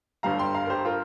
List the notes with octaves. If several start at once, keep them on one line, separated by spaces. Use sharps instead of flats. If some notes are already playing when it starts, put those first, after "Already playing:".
G1 G2 G3 F5 A#5
G5 C6
F5 A#5
A#4
G4 C5
F4 A#4